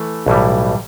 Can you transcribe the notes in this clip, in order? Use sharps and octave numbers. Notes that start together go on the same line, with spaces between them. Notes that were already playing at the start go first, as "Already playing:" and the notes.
Already playing: E3 A3
B1 A2 E3 G3